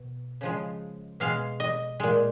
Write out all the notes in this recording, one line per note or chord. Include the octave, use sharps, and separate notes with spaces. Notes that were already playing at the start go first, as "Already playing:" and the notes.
Already playing: B2
C#3 F3 G#3
B2 G#3 F5
D#5
A#2 G#3